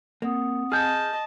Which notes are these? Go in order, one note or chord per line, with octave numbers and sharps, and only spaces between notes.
A#3 C4 F#5 D#6
G#4 D#5 A5 F6 G6